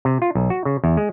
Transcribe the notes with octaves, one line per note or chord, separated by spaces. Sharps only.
C3
F4
B1
F#4
C#3
E2
G#3